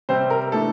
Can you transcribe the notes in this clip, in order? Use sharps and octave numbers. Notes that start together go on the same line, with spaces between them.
C3 G3 C4 C5
A#4
E3 A3 D4 A4